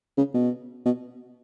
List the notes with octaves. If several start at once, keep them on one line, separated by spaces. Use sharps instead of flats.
C#3
B2
B2